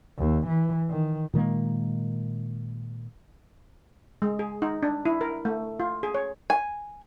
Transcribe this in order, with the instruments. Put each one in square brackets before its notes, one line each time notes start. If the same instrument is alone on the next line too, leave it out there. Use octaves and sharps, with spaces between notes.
[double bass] D#2
E3
D#3
[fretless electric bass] A#2 D#3 G#3 A#3
[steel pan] G#3
G#4
D#4
D4
E4
A#4
A3
F4
G#4
C#5
[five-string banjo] G#5